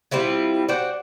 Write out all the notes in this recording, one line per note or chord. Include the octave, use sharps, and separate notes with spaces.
G3 C4 E4 F4
F#4 C5 D5